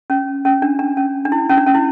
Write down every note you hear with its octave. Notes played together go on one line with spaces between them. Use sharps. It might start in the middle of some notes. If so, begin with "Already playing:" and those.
C#4
C#4
D4
D4
C#4
D4
E4
C#4
D4
C#4
E4